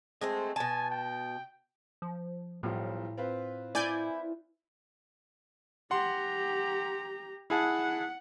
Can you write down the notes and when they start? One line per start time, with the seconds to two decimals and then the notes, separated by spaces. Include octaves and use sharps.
0.21 G#3 A3 C4 C5
0.56 B2 G#5 A5
0.90 G5
2.02 F3
2.63 B1 A2 F3 G3
3.17 C4 F4 B4
3.75 E4 D5 G#5 G6
5.91 G4 F#5 A#5 C6
7.50 E4 G#4 F#5 A5